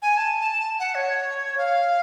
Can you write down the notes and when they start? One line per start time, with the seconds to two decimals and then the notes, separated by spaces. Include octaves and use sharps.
0.02 G#5
0.17 A5
0.41 A5
0.80 F#5
0.95 C#5
1.58 F5